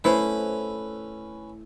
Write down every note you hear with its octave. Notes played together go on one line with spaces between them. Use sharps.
A3 C#4 E4 B4 C5